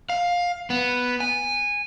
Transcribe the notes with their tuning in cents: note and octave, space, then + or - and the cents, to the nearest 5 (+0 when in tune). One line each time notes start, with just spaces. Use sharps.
F5 +15
B3 +0
G#5 -15